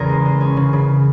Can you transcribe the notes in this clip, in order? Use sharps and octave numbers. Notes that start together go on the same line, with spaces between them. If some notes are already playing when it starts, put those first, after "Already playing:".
Already playing: E2 C#3 G#4 A#4
G#3
G#3
C#4
C#3
C#3